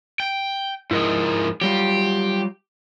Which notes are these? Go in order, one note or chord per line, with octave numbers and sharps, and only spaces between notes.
G5
G#2 F3 E4 A#4 D#5
F#3 G3 F4 G4